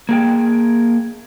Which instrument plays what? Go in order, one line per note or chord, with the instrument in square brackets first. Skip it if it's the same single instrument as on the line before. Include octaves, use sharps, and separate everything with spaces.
[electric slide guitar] A#3 G#4 G5